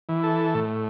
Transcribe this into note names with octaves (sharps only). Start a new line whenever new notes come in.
E3
A4
A2